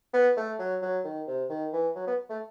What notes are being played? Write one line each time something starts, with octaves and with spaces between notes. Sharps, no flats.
B3
A3
F#3
F#3
D#3
C3
D#3
E3
F#3
B3
A3